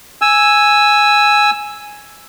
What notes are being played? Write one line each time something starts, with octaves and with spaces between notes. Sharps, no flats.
G#5 E6